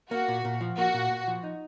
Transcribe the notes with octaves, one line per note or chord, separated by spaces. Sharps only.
A#3 F#4
A#2
A#2
F3
A#3 F#4
A#2
A#2
F3
D#4